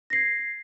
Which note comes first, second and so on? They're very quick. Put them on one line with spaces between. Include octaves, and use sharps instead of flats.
A#6 C7 G#6